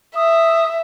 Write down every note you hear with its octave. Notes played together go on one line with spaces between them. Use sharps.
E5 D#6